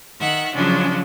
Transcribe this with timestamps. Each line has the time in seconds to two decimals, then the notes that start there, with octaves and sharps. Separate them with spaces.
0.20 D#3 E5 F#5 F#6
0.55 C#3 F3 F#3 G#3 C#4 D4